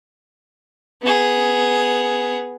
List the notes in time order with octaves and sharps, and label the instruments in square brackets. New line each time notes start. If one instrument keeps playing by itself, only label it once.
[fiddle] B3 G#4